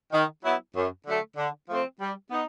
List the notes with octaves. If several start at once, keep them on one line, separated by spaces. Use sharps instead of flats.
D#3
F#3 B3 E4
F#2
D3 F#3 A3
D3
F3 A3 C4
G3
B3 D#4